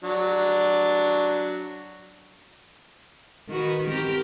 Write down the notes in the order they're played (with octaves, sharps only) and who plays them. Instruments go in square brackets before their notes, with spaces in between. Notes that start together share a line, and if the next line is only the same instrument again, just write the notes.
[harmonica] F#3 D4
[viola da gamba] D#3 F#4 B4
C4 G4 A#4